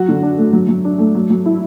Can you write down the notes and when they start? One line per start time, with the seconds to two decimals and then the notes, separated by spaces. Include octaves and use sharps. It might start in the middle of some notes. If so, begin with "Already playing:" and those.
Already playing: F#3 F#4
0.09 D3
0.23 D4
0.38 A3
0.53 F#3
0.68 F#3
0.85 D4
0.99 A3
1.15 F#3
1.30 F#3
1.46 E4